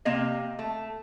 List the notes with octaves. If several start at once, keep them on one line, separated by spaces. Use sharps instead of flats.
C3 A#3 C4 D#5
A3